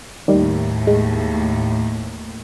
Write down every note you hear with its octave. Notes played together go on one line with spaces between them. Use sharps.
D#2 A2 D#3 G3
G#3